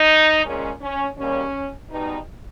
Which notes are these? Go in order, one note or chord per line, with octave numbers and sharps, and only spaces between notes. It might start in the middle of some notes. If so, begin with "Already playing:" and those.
Already playing: D#4
A#2 G#3 C#4
C#4
D#2 C#3 G3 A#3 C#4
B2 G3 B3 D#4